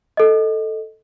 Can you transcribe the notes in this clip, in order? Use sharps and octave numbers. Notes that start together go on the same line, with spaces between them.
A4 D#5